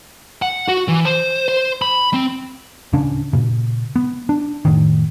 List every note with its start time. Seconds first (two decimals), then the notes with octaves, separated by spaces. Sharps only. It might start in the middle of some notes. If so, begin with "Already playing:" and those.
0.42 F#5
0.68 F#4
0.88 E3
1.05 C5
1.48 C5
1.82 B5
2.14 C4
2.93 D1 C#3 C#4 D4
3.33 A#2 C#3
3.96 B3
4.29 D4
4.65 F1 A2 D#3